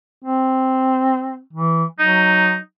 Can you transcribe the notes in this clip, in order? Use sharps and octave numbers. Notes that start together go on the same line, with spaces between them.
C4
E3
F#3 D#4